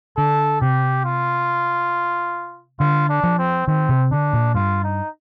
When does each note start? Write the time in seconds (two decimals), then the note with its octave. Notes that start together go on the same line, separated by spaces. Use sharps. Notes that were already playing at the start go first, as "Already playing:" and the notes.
0.17 D3 A4
0.61 C3 G4
1.05 F4
2.80 D3 F4
3.09 D4
3.23 F3
3.38 C4
3.67 D#3 C4
3.89 C3
4.11 D3 D4
4.33 A#2
4.54 G2 F4
4.84 D#4